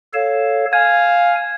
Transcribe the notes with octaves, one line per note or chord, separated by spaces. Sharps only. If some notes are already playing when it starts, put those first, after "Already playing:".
A4 C#5 F5 E7
F5 G#5 G#6